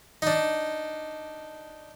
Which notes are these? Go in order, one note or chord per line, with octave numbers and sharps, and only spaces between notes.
D4 D#4